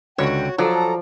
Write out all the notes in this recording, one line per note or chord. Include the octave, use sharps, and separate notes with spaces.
C#2 D3 F#4 C#5 G5
F3 F#3 A4 D5 A#5